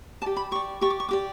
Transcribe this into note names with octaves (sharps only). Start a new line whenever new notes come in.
G4 D5 A5
B5
G4 D5 C#6
G4 D5 C#6
D6
C#6
G4 D5 D6